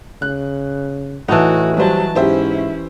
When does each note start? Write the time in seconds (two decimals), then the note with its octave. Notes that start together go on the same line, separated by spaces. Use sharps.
0.22 C#3 F#6
1.28 A2 E3 D#4 F#4 F#5 A5
1.77 F#3 G3 C5 A5
2.15 G#2 C#4 E4 G4 C5 E5